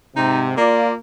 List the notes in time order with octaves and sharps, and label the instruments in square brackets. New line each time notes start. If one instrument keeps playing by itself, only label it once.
[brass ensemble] G#2 C3 [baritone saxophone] D#4
[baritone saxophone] A#3 [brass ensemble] F4 D5